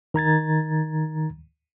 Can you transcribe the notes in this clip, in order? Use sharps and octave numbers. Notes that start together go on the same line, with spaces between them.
D#3 A#5 G#6 A6